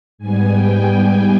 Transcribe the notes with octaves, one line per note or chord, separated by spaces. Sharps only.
G#2 G3 B3 G#5
G5
G5
G5